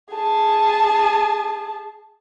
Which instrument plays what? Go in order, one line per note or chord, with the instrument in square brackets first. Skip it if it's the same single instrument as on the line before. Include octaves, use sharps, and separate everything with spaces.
[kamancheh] G#4 A5